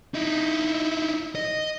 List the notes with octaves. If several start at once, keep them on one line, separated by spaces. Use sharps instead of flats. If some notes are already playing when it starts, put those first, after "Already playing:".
D#4 E4
D#5